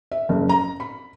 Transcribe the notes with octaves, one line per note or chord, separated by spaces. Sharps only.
E5
F#1
A#5
B5